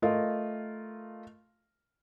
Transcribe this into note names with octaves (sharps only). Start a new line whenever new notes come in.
A3 F4 A#4 D#5